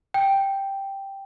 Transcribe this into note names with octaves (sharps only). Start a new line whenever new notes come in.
G5